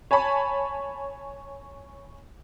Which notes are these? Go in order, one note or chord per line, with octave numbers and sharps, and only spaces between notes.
C#5 G#5 A5 B5 C#6